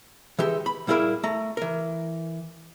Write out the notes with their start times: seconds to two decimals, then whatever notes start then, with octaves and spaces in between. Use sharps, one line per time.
0.39 E3 G#3 G4 A4
0.66 B5
0.87 A#2 G3 E4 G#4 A#4 B5
1.23 A3 A#5
1.57 E3 A#4